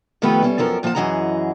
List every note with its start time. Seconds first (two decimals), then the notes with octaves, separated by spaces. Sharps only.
0.22 D#3 F3 A3 B3 G4 B4
0.43 G3 C#4 A4
0.58 F#2 F3 A4 A#4
0.83 A#2 F3 F5 F#5 A5
0.95 F#2 E3 G#4 D#5 F#5 A#5